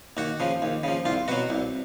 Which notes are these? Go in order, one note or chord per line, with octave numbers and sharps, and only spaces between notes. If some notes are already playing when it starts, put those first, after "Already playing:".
D#2 F#4
C#3 F3
D#2
C#3 F3
C2 F4
B2 F#3 F#4
C2